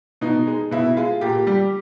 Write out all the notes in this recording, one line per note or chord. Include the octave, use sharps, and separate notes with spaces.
B2 D#4
G#3
B2 E4
G#3 F4
A#2 G4
G3